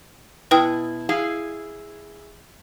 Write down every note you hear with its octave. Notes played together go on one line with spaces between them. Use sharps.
B2 E4 B4 G5 D#6
E4 G#4 F5